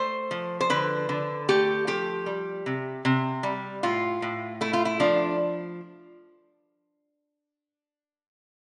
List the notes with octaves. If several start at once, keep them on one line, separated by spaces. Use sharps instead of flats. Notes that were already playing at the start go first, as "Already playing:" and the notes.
Already playing: A3 C5
F3
C5
D3 B4
D3
A3 G4
F3 G4
G3
C3
C3
G3
A2 F4
A2
A3 E4
F4
E4
F3 D4